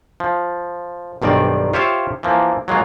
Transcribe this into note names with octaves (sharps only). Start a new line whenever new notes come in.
F3
B1 G2 D#3 C4 D5
F4 G4 C5 C#5 E5 F5
E3 F3 A#3
F#3 G#3 A#3 F4